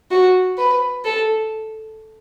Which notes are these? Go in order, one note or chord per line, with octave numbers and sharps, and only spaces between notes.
F#4
B4
A4